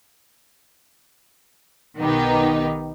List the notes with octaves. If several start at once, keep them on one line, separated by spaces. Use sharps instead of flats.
B1 D#3 B3 D#4 G4